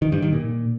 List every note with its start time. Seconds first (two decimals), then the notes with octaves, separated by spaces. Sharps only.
0.02 D#3
0.12 G2
0.22 D#3
0.33 A#2